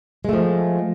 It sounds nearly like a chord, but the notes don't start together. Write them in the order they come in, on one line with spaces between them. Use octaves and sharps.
G#3 A3 F3